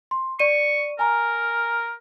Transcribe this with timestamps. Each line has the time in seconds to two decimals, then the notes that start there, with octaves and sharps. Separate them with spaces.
0.11 C6
0.40 D5 C#6 D#7
0.99 A#4 G#5 A#5